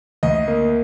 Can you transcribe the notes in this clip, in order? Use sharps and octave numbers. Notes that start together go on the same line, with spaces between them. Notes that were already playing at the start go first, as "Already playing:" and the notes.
D2 D#5
A#3